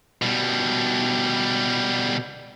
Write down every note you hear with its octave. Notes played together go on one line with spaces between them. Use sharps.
B2 G3